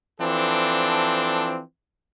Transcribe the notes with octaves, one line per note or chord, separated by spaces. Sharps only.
E3 F3 C4 D4 A4